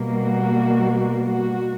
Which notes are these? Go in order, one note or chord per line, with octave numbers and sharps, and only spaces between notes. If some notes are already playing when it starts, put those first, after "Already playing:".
Already playing: B2 G3 A#3
F#4
F#4